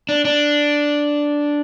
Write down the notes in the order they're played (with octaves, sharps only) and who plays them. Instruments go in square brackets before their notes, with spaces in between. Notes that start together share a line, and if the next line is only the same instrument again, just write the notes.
[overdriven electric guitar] D4
D4